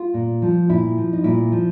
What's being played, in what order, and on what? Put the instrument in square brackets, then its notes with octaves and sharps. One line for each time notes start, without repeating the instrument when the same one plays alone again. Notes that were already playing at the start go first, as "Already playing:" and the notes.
Already playing: [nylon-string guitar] F4
A#2
F3
A#2 E4
F3
D#4
A#2 E4
F3